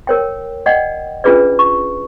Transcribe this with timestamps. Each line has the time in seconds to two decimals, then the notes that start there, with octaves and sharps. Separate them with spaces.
0.07 A#4 C#5 G5
0.66 D5 D#5 F#5 G5
1.24 C#4 D4 F4 G#4 B4 D5
1.59 C#6